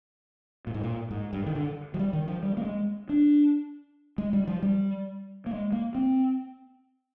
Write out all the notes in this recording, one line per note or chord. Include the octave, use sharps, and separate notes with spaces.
A#2
G#2
A#2
G#2
G2
D#3
D3
F3
G3
D#3
F3
G3
A#3
G#3
D4
G#3
G3
F3
G3
A#3
G#3
A#3
C4